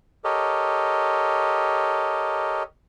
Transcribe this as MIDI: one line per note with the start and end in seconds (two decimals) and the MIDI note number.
0.24 2.63 67
0.24 2.63 69
0.24 2.63 70
0.24 2.63 73
0.24 2.63 75